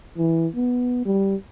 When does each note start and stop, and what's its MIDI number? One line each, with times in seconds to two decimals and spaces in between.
0.18 0.47 52
0.55 1.01 59
1.05 1.35 55